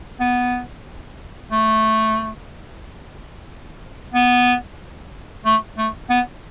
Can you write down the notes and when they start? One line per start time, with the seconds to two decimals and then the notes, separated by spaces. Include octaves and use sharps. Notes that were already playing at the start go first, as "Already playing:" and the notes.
0.20 B3
1.52 A3
4.14 B3
5.46 A3
5.78 A3
6.10 B3